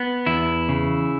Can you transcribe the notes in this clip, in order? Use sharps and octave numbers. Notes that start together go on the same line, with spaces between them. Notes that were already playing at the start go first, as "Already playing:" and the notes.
Already playing: B3
E2 E4
C#3